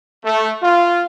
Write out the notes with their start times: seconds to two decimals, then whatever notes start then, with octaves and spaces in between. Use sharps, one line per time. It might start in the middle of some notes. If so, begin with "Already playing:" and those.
0.25 A3
0.63 F4